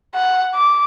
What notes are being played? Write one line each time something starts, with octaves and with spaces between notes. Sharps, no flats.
F#5
D6